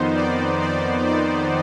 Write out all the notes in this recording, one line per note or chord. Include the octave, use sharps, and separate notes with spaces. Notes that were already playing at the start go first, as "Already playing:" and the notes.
Already playing: F2 D#3 B3 D#4 C5
D5
D5
D5